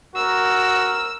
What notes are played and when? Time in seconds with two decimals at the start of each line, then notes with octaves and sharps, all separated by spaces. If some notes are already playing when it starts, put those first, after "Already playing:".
0.16 F#4 A#4 E6